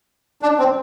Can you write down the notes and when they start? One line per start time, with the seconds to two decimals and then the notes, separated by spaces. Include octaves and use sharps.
0.42 D4
0.59 C4